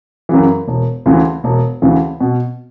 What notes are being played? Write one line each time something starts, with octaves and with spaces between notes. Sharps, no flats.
F#2 C#3 E3
E1
D2 C#3 E3
E1
D2 C#3 E3
B2